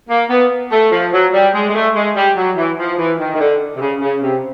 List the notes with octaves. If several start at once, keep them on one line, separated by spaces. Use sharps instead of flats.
A#3
B3
A3
F3
F#3
G3
G#3
G#3
A3
G#3
G3
F#3
E3
F3
E3
D#3
D#3
D3
C3
C#3
C#3
C3